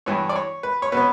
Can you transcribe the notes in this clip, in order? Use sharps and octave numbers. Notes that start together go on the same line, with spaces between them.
G2 E3 B3 C#5
D5
C#5
B4
C#5
B2 F#3 B3 B4